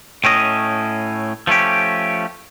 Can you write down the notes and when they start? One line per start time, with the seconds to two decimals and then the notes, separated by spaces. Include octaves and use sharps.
0.24 A2 A3 C#4 D#5
1.47 F3 A3 C#4 G4